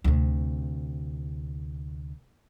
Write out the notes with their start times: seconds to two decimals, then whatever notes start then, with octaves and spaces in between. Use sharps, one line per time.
0.04 D2 C3